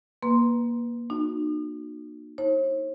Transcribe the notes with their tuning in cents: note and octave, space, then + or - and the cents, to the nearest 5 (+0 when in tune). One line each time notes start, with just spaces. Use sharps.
A#3 +20 B4 +0 C6 +0
D#4 -45 F#4 -25
D#4 +40 C#5 -45